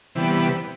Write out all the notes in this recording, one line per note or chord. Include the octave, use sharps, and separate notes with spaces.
C3 E3 G3 B3